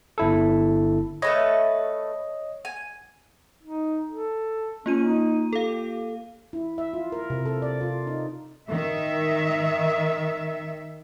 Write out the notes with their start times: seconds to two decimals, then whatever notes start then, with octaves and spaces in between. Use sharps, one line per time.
0.18 G1 E4 A4
1.22 A3 A4 B4 C#5 D#5
2.65 G#5
3.63 D#4
4.10 A4
4.86 A#3 C#4 F4 D#7
5.04 D#4
5.53 G4 A4 F5
6.53 E4
6.78 E5
6.94 F4
7.12 A#4
7.30 C3
7.45 A4
7.62 D5
7.81 F4
8.07 D#4
8.68 D#3 E5